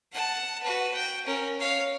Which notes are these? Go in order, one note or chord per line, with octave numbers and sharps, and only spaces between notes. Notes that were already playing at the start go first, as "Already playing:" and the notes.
F#5 A5
F#4 B4
G5
C#4 A#4
C#5 F5